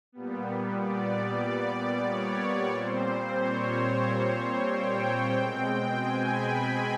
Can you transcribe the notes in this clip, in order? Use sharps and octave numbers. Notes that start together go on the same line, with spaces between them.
A#2 G3 B3
D5
D5
C#5
A#2 G3 C4 C5
C#5
G5
B2 G#3 C4 G5
G#5
B5
B5